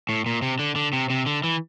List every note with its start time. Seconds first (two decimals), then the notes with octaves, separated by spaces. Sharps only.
0.09 A2
0.26 A#2
0.42 C3
0.59 D3
0.76 D3
0.93 C3
1.10 C3
1.26 D3
1.44 E3